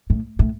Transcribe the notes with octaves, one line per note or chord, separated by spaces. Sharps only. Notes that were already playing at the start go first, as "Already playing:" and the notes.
A2
A2